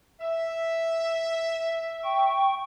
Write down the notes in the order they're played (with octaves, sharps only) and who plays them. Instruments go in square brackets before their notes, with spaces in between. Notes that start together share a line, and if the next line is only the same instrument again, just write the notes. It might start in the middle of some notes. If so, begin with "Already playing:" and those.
[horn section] E5
[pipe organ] G5 C#6